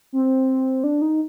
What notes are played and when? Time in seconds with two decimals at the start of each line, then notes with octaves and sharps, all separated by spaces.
0.13 C4
0.84 D4
1.02 D#4